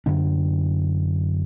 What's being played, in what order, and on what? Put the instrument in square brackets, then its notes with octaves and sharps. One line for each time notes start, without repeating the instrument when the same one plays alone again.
[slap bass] F#2 D3 D4